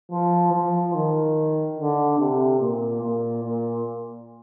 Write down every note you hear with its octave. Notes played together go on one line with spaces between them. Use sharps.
F3
F3
D#3
D3
C3
A#2
A#2
A#2